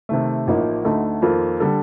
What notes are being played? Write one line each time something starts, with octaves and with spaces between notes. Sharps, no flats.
C3 D#3 A3
A1 A2 F3 A#3 D#4
D2 D3 A3 D#4 A4
F2 D#3 A#3 F4 A4
D3 G3 D4 A4